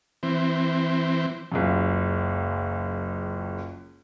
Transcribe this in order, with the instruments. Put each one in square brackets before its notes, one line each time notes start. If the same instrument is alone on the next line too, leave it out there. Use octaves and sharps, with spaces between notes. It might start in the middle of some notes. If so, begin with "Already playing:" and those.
[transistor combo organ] E3 C4
[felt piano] F#1 C#2 F#2